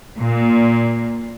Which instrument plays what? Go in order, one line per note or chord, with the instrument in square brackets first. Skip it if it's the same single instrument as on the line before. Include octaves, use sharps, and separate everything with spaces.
[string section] A#2